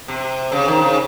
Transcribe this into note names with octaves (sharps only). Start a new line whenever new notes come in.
C3
C#3
D#3
C#3